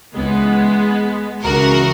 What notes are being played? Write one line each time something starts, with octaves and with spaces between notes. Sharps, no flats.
C#2 C#3 E3 G#3 B3
C#2 C#3 E3 F#4 A#4